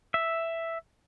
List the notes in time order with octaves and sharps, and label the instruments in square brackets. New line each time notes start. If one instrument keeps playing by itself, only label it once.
[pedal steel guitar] E5